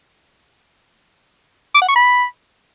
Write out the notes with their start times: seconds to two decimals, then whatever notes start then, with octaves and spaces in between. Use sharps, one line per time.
1.75 D6
1.82 F#5
1.89 C#6
1.96 B5